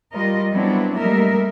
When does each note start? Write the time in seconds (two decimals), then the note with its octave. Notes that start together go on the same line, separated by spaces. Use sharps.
0.14 G3 F4 A#4 D#5
0.52 F#3 G3 B3 C4 D4 E4
0.98 G3 A3 A#3 A#4 D#5 E5